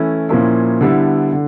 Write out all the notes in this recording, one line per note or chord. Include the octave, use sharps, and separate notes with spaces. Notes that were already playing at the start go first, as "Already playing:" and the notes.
Already playing: E3 A3 C#4 E4
A#2 F3 A#3 C#4 E4
D3 G3 B3 E4 A4
D3